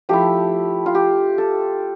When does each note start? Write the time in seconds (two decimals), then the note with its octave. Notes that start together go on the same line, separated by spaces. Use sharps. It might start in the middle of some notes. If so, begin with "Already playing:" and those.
0.09 F3 A3 E4 G4
0.86 F4
0.95 G4
1.38 A4